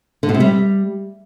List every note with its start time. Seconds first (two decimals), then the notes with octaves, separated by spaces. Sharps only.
0.23 D3
0.29 B2
0.34 C3
0.40 G3